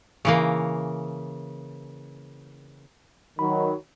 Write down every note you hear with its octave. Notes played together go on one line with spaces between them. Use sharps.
C#3 E3 A#3
D#3 F#3 B5